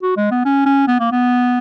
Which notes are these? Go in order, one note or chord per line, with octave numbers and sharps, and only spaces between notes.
F#4
G#3
B3
C#4
C#4
B3
A#3
B3